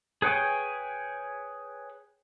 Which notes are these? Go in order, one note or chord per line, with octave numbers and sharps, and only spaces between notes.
G#4 B4 C#5 G5 G#5